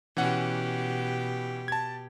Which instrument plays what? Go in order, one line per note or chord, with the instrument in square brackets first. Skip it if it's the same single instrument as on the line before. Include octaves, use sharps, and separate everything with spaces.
[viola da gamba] B2 G4 [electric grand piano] E3 C#4 F#5
[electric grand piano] A5 G#6